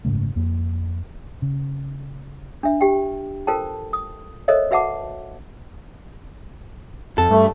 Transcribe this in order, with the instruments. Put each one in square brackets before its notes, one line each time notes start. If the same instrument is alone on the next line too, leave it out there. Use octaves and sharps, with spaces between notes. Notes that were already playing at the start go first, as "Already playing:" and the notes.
[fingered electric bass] F#1 G#2 C#3 A3
F2 A#3
C#3
[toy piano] D4 E5
G4 G5
F4 A4 A#4 C5 G5 A5
D#6
A4 A#4 C5 C#5 D#5 E5
F#4 B4 E5 F#5 A5 D6
[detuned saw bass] F2 [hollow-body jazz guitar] A4
[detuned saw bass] G2 [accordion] A3